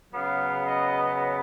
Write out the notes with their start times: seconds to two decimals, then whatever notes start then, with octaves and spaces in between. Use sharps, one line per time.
0.13 C#3 F#3 B3 F5
0.65 D#5